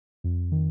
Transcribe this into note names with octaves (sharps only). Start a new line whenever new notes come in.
F2
D#3